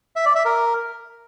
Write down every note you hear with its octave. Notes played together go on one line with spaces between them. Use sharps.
E5
D5
E5
A#4